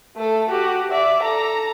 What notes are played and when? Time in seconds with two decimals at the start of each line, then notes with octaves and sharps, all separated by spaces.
0.17 A3 A4
0.50 F#4 G4
0.91 D5 E5
1.22 A4 A#5